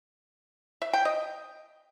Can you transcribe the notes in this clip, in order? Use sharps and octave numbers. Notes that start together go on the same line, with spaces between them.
E5
G5
D#5